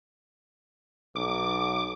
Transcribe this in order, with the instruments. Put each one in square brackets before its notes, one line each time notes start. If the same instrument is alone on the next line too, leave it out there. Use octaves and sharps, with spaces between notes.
[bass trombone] B1 [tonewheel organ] D6